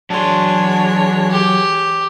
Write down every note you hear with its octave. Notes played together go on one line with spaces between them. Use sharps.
E3 F#3 G#3 D4 C#5 C6
G4